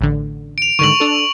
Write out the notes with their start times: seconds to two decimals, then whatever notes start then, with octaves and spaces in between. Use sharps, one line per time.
0.01 A1 D3
0.58 D7 F7
0.79 G#2 D3 D#3 C#6 F#7
1.00 D4 A4